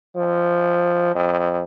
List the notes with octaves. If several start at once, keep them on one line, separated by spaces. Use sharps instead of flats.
F3
F2